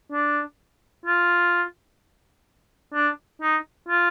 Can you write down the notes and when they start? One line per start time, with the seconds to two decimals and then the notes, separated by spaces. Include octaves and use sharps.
0.12 D4
1.06 F4
2.94 D4
3.42 D#4
3.88 F4